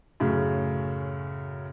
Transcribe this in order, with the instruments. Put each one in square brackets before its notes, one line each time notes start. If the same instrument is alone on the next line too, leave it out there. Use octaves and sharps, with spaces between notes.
[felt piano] F#2 A2 C#3